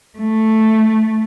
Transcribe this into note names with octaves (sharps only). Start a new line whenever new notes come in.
A3